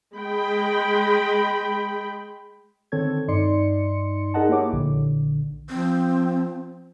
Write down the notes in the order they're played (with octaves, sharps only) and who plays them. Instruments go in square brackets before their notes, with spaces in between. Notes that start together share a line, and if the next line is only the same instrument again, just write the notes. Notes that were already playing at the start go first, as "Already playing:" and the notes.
[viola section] G#3 G5 B5
[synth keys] D3 D#3 C4 A4 C#5 G#6
G2 D#4 D5 C6 C#7
D#4 G#4 A#4 D#5 F#5 A5
A#3 E4 G4 C#5 D6
A#1 D3
[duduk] F3 [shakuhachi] C4